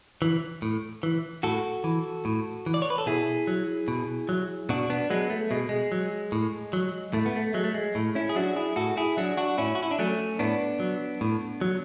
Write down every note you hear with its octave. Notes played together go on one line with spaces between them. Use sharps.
E3
A2
E3
A2 F#4 A4
E3
A2
E3
D5
C#5
B4
A4
B2 E4 G#4
F#3
B2
F#3
B2 D4 F#4
B3 D4
F#3 G#3 B3
A3
B2 G#3
G#3
F#3
A2
F#3
A2 A3
B3
A3
F#3 G#3
A3
G#3
A2 A3
C#4 E4
G#4
F#3 D4 F#4
E4 G#4
A2 F#4 A4
E4 G#4
F#3 D4 F#4
D4 F#4
A2 C#4 E4
F#4
E4
D4
F#3 A3 C#4
A2 B3 D4
F#3
A2
F#3